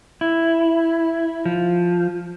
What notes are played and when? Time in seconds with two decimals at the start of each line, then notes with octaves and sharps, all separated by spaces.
0.21 E4
1.45 F3